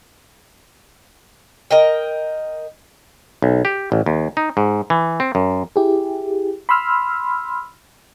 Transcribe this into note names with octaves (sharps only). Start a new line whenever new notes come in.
A#4 D#5 G5
B1
G4
A1
D#2
D#4
G#2
E3
C4
F#2
E4 G4 G#4
B5 C6 E6 F6